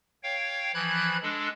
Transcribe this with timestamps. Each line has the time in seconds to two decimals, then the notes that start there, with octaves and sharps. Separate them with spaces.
0.23 C#5 F5 G5
0.74 E3 F3 B5 F#6 G#6
1.22 G#3 D4 A4